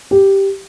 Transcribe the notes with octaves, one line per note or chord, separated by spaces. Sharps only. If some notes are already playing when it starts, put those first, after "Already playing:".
G4